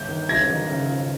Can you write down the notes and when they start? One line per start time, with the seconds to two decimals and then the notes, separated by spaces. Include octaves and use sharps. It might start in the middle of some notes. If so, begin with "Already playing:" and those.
Already playing: G1 G6
0.08 D#3
0.28 G2 G#6 A#6
0.49 D#3
0.70 C#3
0.90 F3